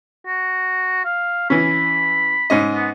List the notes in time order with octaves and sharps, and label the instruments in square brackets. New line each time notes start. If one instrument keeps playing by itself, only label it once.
[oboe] F#4
F5
[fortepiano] E3 C#4 [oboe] B5
[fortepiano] G#2 C#4 D#5
[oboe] B3